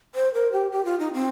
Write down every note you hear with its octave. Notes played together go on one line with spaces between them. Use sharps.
C5
A#4
G4
G4
F4
D#4
C4